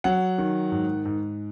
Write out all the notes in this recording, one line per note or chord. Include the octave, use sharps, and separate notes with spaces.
F#3 F#5
D#3
G#2
G#2